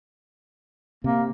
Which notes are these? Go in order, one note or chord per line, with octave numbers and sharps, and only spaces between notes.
C3 A#3